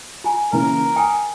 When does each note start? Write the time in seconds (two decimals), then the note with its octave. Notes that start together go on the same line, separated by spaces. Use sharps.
0.24 F4 G#5 A#5
0.53 C#3 E3 A#3 A#4
0.96 G5 G#5 D#6